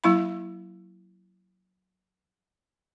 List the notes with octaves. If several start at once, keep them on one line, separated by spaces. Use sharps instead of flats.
F#3 A#3 E4 F5 B5